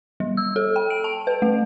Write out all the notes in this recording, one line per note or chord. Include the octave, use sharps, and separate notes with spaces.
G3
E6
A4
G5
D7
A5
B4
A3